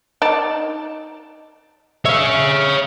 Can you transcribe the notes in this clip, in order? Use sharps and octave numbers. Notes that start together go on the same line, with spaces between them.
D#4 D5 A5
C#5 E5 F5